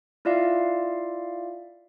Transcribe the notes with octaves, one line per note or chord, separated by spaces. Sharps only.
E4 F4 D5 E5 F5